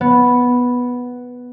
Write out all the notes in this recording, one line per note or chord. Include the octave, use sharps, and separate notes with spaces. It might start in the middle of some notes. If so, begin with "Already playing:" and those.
B3